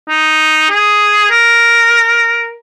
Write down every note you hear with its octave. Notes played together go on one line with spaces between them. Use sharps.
D#4
G#4
A#4